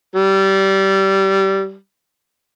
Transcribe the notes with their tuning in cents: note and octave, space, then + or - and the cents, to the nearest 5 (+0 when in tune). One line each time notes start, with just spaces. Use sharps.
G3 -20